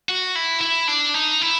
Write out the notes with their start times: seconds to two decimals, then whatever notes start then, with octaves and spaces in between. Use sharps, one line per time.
0.09 F#4
0.35 E4
0.61 E4
0.88 D4
1.14 D#4
1.41 E4